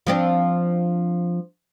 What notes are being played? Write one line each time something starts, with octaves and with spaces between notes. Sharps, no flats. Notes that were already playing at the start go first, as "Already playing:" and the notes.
F3 C4 D4